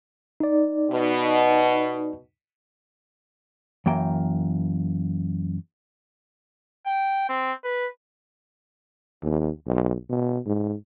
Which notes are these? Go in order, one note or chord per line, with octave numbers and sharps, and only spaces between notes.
D#4 D5
B2
F#2 E3 A#3 G5
G5
C4
B4
D#2
B1
B2
G#2